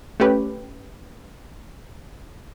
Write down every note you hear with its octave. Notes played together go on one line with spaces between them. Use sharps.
A3 C#4 G4 B4